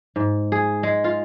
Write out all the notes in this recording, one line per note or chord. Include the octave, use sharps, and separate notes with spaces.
G#2
G#4
G#3
F4